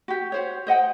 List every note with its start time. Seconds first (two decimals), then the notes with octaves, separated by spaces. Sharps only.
0.08 F#4 G4
0.32 F#4 C5 C#5
0.67 C5 D#5 F#5 G5